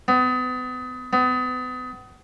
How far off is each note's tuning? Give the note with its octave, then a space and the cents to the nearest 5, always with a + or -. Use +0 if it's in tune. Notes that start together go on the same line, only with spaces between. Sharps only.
B3 +35
B3 +35